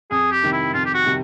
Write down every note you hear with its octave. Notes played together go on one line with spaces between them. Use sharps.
F2 G#4
G4
C3 D#3 G3
E4
F2 F4
G4
F#4
C3 D#3 G3